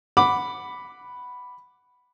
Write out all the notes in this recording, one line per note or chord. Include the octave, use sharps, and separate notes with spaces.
F#5 B5 D6